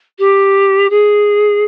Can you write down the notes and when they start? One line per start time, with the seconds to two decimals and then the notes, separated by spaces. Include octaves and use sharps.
0.19 G4
0.90 G#4